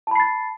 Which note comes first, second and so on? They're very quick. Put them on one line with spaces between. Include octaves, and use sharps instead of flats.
A5 B5 C7 A6